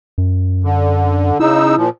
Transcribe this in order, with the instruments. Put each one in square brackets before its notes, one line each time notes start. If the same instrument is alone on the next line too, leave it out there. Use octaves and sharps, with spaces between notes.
[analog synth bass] F#2
[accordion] D3
[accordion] C#3 D#4 E6 [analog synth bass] E4
[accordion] A#2 F3